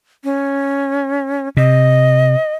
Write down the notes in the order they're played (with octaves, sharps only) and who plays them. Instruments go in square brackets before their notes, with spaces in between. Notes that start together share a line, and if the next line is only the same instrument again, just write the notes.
[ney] C#4
[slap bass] C3 [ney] D#5